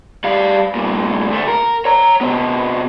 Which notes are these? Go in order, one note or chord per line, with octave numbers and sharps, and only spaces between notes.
G3 F5
G2 A#2
D2 A3
A#4
C#5 A#5
C3 B3